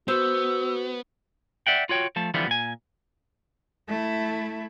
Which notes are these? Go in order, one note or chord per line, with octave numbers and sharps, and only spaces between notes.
B3 F#4 C5 E6
D5 E5 F#5 G5
F4 F#4 C#5 G5
F3 A3 A5
D3 E3 F3 G3 B3 F4
A#2 G#5
A3 E4